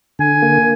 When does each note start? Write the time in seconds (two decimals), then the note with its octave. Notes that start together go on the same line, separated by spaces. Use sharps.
0.19 D3 G#5
0.42 A#3